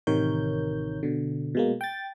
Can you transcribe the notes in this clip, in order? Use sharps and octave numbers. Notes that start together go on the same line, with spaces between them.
A1 C3 D#3 A#4 C#5 G6
B2 D3
B2 G#3 A#3
G5 A6